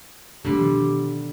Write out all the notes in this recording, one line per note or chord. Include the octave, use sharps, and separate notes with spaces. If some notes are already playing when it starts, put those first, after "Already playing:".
E1 E2 D3 G3 A3 G4
B2 D#3 F3